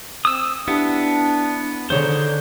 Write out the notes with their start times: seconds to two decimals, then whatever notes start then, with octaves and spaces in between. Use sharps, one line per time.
0.25 C4 D#6 E6
0.68 B3 D4 E4 G4
1.90 D3 D#3 F3 D#4 G#4 C5 C#5